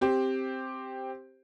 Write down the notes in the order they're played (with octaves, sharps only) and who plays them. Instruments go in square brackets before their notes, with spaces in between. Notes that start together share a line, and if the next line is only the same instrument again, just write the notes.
[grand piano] C4 G4 C5